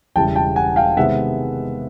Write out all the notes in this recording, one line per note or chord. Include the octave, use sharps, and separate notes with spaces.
E1 E2 C#3 E3 G3 G5 A5
G5 A5
F#5 G#5
F5 G5
C3 D#3 G#3 B3 E5 F#5